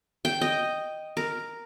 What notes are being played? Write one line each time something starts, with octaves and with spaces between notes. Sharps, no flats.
G5
D#5
A#4